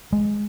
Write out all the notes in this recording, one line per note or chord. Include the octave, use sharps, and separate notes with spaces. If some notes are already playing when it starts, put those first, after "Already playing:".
G#3